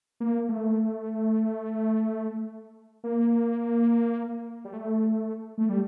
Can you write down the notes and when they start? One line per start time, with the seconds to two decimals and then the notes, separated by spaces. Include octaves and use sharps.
0.20 A#3
0.49 A3
3.04 A#3
4.65 G3
4.73 A3
5.58 A3
5.69 G3